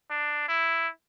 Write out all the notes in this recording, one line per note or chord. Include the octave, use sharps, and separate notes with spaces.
D4
E4